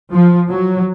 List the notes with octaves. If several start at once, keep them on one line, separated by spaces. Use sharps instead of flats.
F3
F#3